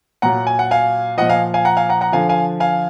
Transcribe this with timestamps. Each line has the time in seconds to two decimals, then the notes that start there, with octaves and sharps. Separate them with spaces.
0.22 A#2 F#3 F#5 A#5
0.47 G#5
0.59 F#5
0.71 F5 G#5
1.17 A#2 F3 D#5 F#5
1.29 F5 G#5
1.54 F5 G#5
1.65 F#5 A#5
1.77 F5 G#5
1.89 F#5 A#5
2.01 F#5 A#5
2.12 D3 F3 F5 G#5
2.29 F5 G#5
2.60 F5 G#5